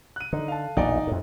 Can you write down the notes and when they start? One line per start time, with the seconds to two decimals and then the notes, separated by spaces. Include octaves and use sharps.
0.16 F#6 D#7
0.33 D3 D#4
0.48 F5 A5
0.77 A#1 E2 B2 D#4 D5
1.07 F2 A2